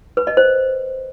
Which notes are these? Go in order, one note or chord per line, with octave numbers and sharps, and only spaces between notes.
B4
D#5
C5